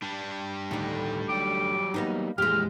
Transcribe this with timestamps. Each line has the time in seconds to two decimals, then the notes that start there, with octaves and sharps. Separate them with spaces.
0.02 G3 D4
0.71 D2 A2 D#3 D#4 A4
1.29 F#3 G4 D6
1.94 A#3 B3 D#4
2.38 F2 A#2 E3 G#3 G4 F6